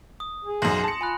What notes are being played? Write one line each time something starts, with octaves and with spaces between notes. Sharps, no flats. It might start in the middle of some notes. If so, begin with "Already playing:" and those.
D#6
G#4
B1 F#2 C6 A#6 F#7
A5 C#7
F4 G#5 B5 F#6